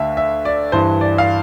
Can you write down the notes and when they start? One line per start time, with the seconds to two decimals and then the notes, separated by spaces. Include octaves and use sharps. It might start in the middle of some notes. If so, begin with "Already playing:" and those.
Already playing: D2 D3 E5 F5
0.17 E5
0.45 D5
0.72 G2 E3 C5
1.01 D5
1.18 F5